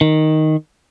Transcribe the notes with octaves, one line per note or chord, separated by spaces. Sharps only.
D#3